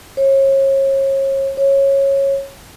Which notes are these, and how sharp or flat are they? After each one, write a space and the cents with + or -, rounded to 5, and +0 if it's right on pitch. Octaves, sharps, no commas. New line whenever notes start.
C#5 -35
C#5 -15